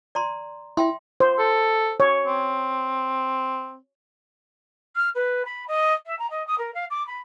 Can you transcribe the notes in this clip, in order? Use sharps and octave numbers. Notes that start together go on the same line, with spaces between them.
D5 A#5 C6
E4 E5 G5 C6
C5
A4
C#5
C4
F6
B4
B5
D#5
E5
A#5
D#5
D#6
A#4
F5
D6
B5